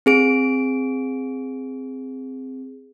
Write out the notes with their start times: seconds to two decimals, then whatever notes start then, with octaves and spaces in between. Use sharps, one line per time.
0.06 C4 G#4 D7